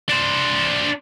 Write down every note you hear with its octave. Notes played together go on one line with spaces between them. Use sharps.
D4 C5